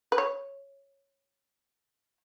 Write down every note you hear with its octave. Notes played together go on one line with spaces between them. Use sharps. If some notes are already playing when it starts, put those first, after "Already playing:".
B4
C#5